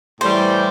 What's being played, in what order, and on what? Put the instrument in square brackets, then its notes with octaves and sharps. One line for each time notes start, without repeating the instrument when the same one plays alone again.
[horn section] A2 E3 G3 [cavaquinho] C5